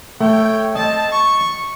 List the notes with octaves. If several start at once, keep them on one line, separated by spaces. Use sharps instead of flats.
A3 C#5 G5
C4 D#5 A5
C#6